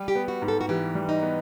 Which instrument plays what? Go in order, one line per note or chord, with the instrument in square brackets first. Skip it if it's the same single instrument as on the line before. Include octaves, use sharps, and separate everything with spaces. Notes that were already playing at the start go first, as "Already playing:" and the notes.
Already playing: [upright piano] G3
[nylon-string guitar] G4
[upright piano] B3
[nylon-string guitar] F#4
[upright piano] G#2
[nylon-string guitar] A4
F#4
[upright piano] E3 [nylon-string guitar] G4
[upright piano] G3
[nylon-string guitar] D#4
[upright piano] B3